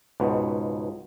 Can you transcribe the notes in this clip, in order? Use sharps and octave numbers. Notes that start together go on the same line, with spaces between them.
C#2 G#2 B2